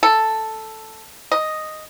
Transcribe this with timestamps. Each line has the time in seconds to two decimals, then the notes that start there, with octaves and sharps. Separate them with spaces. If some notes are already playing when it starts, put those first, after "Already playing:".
0.03 A4
1.32 D#5